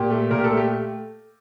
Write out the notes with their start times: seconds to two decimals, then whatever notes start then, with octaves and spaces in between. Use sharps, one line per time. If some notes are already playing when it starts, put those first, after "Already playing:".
Already playing: A#2 G4
0.10 A3
0.30 A#2 A#4
0.39 G4
0.44 A4
0.51 A3
0.57 G4